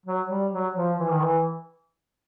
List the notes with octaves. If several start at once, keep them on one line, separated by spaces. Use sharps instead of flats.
F#3
G3
F#3
F3
E3
D#3
E3